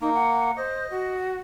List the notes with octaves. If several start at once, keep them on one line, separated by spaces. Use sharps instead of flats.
A#3 D#4
F#5
C5 D#5
F#4